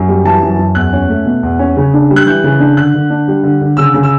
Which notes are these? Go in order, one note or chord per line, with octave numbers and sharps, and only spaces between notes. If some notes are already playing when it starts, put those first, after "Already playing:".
Already playing: F#2
G3
E3 A5
F#2
F#2
E2 F#6
C#4
A3
B2
E2
C#4
C#3
D4
G3
F#6
E3 G6
C#3
D4
D3 F#6
D3
D4
G3
D3
D3
C#3 E6
C#3
E6